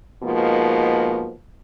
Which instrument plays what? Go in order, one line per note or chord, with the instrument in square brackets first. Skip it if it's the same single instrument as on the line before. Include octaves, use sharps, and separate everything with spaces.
[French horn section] G#2 B2 F3 A#3